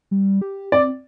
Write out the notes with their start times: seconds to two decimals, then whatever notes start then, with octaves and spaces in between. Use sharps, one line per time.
0.11 G3
0.41 G4
0.72 C4 D5